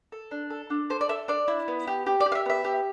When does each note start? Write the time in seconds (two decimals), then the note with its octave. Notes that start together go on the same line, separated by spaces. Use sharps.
0.12 A4
0.31 D4
0.50 A4
0.70 D4
0.90 A4 C5
1.01 D5
1.09 A4 E5
1.28 D4 D5
1.48 E4
1.68 B3
1.87 G4
2.06 G4
2.20 D5
2.26 G4
2.32 F5
2.35 E5
2.46 B3 E5
2.65 G4